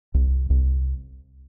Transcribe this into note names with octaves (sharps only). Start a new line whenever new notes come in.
C2
C2